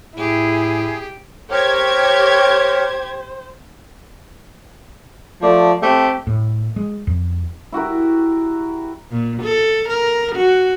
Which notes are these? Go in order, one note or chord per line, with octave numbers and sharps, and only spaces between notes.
A2 E4 G4 G#4
G4 A#4 C5 C#5 G#6
F3 A3 D5
A3 C4 G4
A2
G#3
F2
E4 F#4 G4 A#4
A#2
A4
A#4
F#4